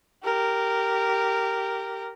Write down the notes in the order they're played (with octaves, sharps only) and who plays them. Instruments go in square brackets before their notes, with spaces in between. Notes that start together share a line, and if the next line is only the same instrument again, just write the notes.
[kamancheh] G4 A#4